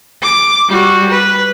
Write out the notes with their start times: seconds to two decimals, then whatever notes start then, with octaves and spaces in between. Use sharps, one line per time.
0.22 D6
0.68 G3 F#4
1.09 B4